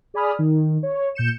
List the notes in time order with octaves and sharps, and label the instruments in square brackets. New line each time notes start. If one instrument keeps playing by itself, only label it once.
[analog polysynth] G#4 D5 G#5 B5 D#6 F6
D#3
C#5
A#2 G6 C#7 E7